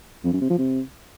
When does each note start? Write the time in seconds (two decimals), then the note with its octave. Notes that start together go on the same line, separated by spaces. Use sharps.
0.24 F2
0.33 F#2
0.41 C3
0.50 F3
0.58 C3